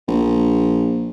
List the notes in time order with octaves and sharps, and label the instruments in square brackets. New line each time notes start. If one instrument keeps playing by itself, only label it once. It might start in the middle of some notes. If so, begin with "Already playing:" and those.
[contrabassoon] A#1